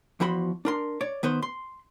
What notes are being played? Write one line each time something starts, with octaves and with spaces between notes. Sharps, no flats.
E2 F3 F#4 B5 C6
D4 A#4 C6
C#5 D5
D#3 B3 B4 C5
C6